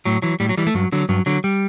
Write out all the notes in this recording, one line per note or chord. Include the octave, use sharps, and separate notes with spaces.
A2 F#3
E3 F#3
A2 G3
F#3
E3 G3
A3
G2 F#3
D3 F#3
G2 F#3
D3 F#3
G3